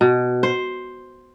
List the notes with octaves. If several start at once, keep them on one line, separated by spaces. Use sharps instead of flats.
B2
C5